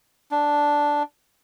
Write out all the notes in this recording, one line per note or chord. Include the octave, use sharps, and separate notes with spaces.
D4